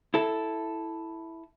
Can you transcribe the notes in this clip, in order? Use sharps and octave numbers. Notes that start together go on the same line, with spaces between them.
E4 A4